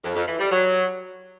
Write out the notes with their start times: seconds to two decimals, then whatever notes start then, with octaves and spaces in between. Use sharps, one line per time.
0.04 F2
0.16 F2
0.27 E3
0.39 G3
0.51 F#3